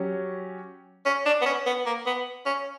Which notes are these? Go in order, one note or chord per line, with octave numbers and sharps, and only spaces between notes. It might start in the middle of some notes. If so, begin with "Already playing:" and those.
Already playing: F#3 C#4 G4
C#4
D4
B3
C#4
B3
A#3
B3
C#4